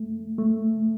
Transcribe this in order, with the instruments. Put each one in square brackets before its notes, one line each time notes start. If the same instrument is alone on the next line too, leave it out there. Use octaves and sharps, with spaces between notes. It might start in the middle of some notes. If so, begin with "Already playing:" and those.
Already playing: [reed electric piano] A3
A3